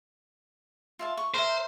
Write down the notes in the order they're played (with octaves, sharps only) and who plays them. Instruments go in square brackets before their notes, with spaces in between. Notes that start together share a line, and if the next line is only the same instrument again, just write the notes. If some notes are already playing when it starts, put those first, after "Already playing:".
[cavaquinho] F4 E5 A5
C#6
[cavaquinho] A#4 E5 [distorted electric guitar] C5